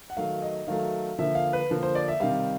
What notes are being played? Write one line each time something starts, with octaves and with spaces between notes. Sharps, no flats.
F#5
D#3 F#3 A3 F5
D#5
D#3 F#3 A3 F5
D3 F3 A#3 E5
F5
B4
D3 F3 A#3
C5
D5
E5
C3 D#3 G3 F5